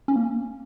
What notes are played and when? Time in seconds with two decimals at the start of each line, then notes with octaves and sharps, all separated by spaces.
0.08 C#4
0.16 A#3